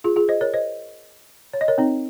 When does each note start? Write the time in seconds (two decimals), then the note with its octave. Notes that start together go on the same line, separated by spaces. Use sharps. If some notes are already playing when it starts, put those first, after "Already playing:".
0.04 F4 G#4
0.16 F4 G#4
0.29 C5 D#5
0.41 A#4 C#5
0.53 C5 D#5
1.54 C#5
1.61 D#5
1.68 A#4 C#5
1.78 C4 D#4